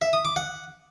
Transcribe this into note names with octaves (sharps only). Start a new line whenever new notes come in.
E5
D#6
D6
F#5